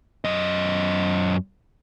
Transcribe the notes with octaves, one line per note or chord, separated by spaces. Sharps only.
F#2 D#5